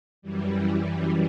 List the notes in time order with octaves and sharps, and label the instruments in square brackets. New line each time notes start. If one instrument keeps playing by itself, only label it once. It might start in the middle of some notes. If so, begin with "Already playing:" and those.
[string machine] F#2 E3 G3